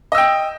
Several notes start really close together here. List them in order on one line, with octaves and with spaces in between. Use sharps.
D#5 E6 G5